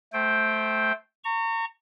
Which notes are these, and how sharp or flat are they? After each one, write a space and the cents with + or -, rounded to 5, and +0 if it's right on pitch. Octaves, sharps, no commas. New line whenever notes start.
A3 -15 C5 +0 G5 +0
A#5 -35 C#6 +0